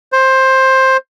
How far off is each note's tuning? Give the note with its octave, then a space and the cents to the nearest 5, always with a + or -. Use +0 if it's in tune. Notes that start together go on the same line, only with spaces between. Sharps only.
C5 +15